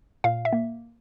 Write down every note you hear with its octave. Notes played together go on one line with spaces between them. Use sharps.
A#2 F5
E5
A#3